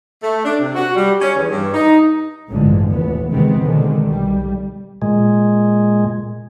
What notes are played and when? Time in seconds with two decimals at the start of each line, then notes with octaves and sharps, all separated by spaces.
0.22 A3
0.45 D4
0.60 C3
0.75 F#4
0.96 G3
1.21 C#4
1.36 E2
1.51 G2
1.74 D#4
2.50 A1 G2 D3 E3 F3 G#3
2.91 F1 D#2 A#2 E3 B3
3.31 C3 D#3 E3 G#3 B3 C4
3.61 B2 D3 D#3 G#3
4.07 B1 G3
5.02 A#2 G#3